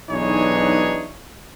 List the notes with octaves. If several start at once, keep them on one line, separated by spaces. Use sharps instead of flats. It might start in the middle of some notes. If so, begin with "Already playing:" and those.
B1 E3 D4 D#4 G#4 C#5